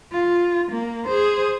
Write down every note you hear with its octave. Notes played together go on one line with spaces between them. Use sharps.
F4
A#3
G#4 C5